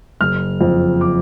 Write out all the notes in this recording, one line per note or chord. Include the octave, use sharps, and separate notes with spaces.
F#1 F6
F2 F3
D6